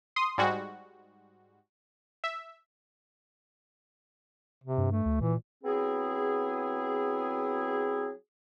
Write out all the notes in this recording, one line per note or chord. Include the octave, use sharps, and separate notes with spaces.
C6 D#6
G#2 G3 G#3 F#4
E5
C3
G2
A3
D2
A#2 E3
F#3 B3 C4 E4 G#4